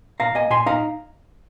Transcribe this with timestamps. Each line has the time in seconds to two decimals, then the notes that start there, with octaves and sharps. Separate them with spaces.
0.20 A#2 F5 A#5
0.35 A#3 D#5 G#5
0.50 A#2 G#5 C6
0.66 D#4 F5 A#5